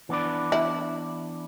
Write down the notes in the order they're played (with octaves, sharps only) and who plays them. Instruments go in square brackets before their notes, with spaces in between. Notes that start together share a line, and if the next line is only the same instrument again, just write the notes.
[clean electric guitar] E3 B3 D4 B4 D5
[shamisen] E4